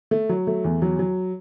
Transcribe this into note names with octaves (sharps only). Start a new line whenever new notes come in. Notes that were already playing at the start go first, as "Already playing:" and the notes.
A3
F#3
A3
E2
F#3
F#3